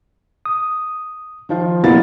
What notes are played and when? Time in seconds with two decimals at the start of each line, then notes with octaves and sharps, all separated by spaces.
0.46 D#6
1.49 D#3 F3 F4
1.84 F#1 A#3 B3 E4 F5 A6